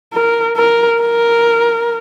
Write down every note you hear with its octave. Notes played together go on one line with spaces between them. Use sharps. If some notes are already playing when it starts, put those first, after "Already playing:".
A#4
A#4
A#4